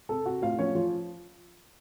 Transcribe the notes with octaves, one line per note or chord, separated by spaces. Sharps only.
C3 A4 A5
C3 F#4 F#5
A2 F4 F5
F3 C#4 C#5
F3 F4